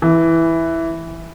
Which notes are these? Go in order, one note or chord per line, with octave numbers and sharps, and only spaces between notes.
E3